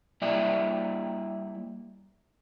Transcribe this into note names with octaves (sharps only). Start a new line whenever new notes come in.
G3 A#3 E4 G4 D5 E5